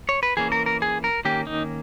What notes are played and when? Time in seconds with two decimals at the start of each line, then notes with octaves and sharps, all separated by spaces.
0.09 C#5
0.23 B4
0.37 E3 A#3 C#4 G#4
0.52 A#4
0.66 A#4
0.82 G#4
1.04 A#4
1.25 D#3 A#3 C#4 G4
1.47 D#4